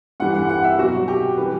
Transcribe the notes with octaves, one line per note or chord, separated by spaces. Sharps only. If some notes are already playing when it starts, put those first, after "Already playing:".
G2 E3 G3 F#5
F#5
F#5
E5
B2 F#3 F#4
G4
E3 G3 B4